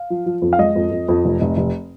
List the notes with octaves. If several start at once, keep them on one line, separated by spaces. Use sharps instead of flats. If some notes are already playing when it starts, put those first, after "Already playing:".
Already playing: F5
F3
F3
F2
F5
G#3 D#5
F2
F2
F2
F1
F1
F1